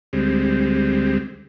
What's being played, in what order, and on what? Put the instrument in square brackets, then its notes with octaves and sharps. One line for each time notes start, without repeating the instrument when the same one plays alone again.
[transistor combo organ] D2 G3 G#3 C4